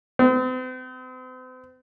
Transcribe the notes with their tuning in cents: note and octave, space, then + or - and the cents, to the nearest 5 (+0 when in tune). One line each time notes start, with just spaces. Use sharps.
C4 -40